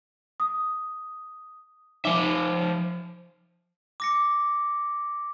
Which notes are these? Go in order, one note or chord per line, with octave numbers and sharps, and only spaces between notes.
D#6
F3 D#4 E5 D6 G7
D6 A#6 C#7